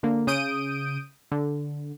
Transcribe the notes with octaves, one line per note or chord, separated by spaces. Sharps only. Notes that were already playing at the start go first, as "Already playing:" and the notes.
D3 A#3
C#3 D#6 G6 D7 D#7
D3